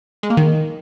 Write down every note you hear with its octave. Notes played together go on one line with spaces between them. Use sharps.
G#3
A#3
D#3